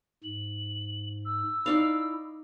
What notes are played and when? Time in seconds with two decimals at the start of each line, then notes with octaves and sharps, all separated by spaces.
0.24 G#2 F#7
1.25 E6
1.66 D#4 E4 D5 F5